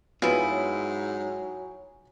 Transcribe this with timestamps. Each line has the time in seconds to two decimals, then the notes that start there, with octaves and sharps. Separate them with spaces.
0.22 G#2 F#3 B3 C4 E4 F4 G#4
0.51 F#3